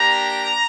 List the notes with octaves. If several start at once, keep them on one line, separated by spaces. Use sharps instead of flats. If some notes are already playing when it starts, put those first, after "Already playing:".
Already playing: A#3 D4 G4 A#5